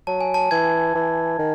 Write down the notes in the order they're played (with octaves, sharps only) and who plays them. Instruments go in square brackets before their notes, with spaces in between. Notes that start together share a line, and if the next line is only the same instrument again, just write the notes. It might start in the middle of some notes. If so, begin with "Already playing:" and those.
[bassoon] F#3 [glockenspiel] A5
[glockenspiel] G#5
A5
[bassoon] E3 [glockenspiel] G#6
[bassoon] E3
D#3